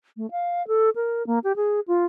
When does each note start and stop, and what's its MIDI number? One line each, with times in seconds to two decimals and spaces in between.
0.17 0.29 57
0.31 0.65 77
0.67 0.90 69
0.95 1.25 70
1.27 1.39 58
1.44 1.56 67
1.56 1.80 68
1.88 2.05 65